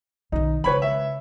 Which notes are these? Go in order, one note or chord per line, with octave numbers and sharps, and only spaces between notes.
B1 D#3 D#4
C#3 G#3 B4 C#5 B5
E5